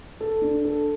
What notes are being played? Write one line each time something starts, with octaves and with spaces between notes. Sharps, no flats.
A4
D4
A4